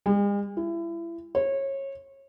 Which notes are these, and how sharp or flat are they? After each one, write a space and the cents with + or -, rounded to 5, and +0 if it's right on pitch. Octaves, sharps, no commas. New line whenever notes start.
G#3 -45
E4 +30
C#5 -25